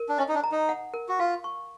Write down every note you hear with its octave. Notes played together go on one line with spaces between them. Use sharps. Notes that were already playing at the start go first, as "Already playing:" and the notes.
Already playing: A#4
D4
C#4 D#5
D#4
D4
A#5
D#4
F#5
A#4
F#4
F4 F5
C#6